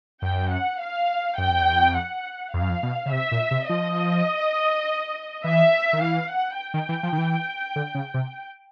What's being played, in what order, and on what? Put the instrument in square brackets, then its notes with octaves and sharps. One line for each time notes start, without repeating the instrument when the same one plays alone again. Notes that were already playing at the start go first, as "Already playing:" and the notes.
[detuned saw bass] F#2 [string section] G5
[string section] F#5
F5
[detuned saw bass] F#2 [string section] G5
[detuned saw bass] F2
E2
F2
[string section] F#5
[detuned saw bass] F2 [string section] F5
[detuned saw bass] F#2
F2
B2
C#3
[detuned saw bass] C3 [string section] E5
[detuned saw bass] A#2
C3
[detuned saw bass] F3 [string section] D#5
[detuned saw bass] E3 [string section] E5
[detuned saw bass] D#3
[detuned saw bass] E3 [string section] F5
[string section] F#5
G5
[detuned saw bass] D#3
E3
F3
D#3
E3
D3
C#3
C3